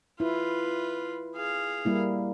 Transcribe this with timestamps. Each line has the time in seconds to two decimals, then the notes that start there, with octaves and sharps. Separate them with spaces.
0.20 E4 F4 B4
1.36 G#4 F5
1.85 G3 A#3 E4